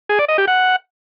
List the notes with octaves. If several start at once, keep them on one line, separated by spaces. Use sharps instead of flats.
G#4
D5
D#5
G4
F#5